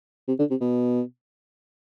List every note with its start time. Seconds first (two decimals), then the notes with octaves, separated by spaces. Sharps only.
0.28 C3
0.39 D3
0.50 C3
0.61 B2